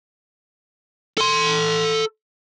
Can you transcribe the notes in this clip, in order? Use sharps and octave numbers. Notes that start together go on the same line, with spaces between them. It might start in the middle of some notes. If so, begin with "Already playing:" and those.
A4 C6